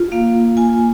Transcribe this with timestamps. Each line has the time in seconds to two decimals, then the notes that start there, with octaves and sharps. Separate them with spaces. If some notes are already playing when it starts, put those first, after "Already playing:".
Already playing: F4
0.12 A#3 F5
0.57 F4 G#5